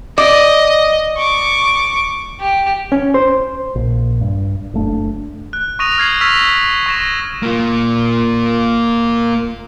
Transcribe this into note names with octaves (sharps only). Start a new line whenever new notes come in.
D5 D#5
C#6 D6
G4
C#4
C5
A#1
G2
F#1 A3 D4
F#6
C#6 D#6 A#6 D#7 F7
F6 G#6 C7 F#7
C#6 E6 F6 A#6 B6 F7
C#6 A#6 E7
A#3 F4